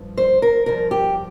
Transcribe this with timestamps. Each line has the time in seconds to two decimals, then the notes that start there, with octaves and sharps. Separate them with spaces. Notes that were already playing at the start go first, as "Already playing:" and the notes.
Already playing: G2 F3
0.17 C5
0.42 A#4
0.66 G2 F3 A#4
0.91 G4